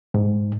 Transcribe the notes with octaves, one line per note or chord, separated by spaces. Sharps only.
G#2